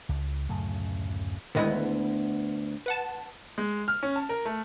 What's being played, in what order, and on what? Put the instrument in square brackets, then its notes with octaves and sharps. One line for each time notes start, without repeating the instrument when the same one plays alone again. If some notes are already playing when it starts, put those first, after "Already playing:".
[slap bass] C#2
D1 F#2 C#3 A3
[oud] D2 B3 D#5 [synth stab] D#3 G#3 E4
[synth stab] B4 F#5 A5
[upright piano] G#3
F6
C#4
A5
A#4
A3